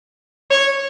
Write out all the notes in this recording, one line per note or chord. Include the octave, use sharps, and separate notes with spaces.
C#5